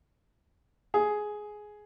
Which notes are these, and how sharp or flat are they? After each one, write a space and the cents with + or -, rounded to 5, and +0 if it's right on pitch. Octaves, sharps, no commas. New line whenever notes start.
G#4 +10